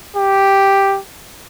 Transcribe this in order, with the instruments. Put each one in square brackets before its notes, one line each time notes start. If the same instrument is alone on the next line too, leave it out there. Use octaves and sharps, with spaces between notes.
[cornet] G4